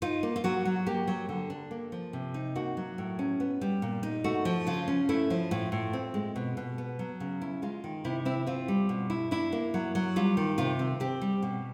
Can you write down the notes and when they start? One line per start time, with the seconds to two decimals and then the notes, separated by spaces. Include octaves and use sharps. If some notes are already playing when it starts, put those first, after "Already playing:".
0.02 D#4 F4
0.23 A#3
0.36 F4
0.44 F#3 F#4
0.65 F#3
0.86 A#3 G4
1.08 F#3
1.29 D3
1.50 D4
1.71 A#3
1.92 F3
2.13 C3
2.34 D#4
2.55 A#3 F#4
2.77 F#3
2.98 A2
3.19 C#4
3.40 B3
3.61 G3
3.82 A#2
4.03 D#4
4.24 A3 F#4
4.45 F3
4.67 C#3 F4
4.88 C#4
5.09 A3 E4
5.30 F3
5.51 A2 F4
5.72 A2
5.93 C4
6.14 G#3
6.36 B2
6.57 B2
6.78 B3
6.99 F#3
7.20 C#3
7.41 E4
7.62 G#3 F4
7.84 D#3
8.04 C3 E4
8.25 C4 E4
8.47 C4 F4
8.68 G3
8.89 B2
9.10 E4
9.31 D4 E4
9.52 A#3
9.74 F#3
9.95 F#3
10.16 G3 F4
10.37 D#3
10.58 C3 F4
10.79 C4
11.00 C4 G4
11.21 G3
11.42 B2